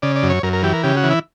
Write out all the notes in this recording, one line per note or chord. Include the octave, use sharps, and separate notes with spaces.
C#3 D5
D5
F#2
C#5
F#2 A#4
A#4
E3 G4
A#4
C#3 G4
F#4
E3
E4